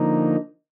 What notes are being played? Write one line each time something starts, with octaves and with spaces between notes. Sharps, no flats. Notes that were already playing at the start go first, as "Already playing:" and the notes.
Already playing: D3 F3 A#3 D#4